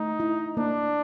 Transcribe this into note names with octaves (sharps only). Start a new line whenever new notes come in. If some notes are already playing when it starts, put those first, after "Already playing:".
Already playing: A3 D#4
E4
A#3 D4